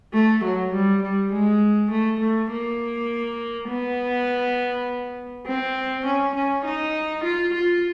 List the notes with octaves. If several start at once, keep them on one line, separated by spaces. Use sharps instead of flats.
A3
F#3
G3
G3
G#3
A3
A3
A#3
B3
C4
C#4
C#4
D#4
F4
F4